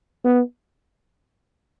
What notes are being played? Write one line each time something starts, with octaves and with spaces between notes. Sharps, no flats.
B3